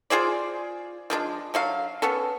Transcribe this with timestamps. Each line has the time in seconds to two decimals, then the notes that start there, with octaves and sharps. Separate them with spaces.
0.10 F4 G#4 C5 D5
1.10 F3 G#3 D4
1.54 D3 F#3 F5
2.02 B3 C#4 A4